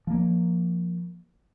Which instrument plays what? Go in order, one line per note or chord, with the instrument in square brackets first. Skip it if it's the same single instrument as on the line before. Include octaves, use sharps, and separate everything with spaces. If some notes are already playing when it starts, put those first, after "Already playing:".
[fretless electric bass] F3 A#3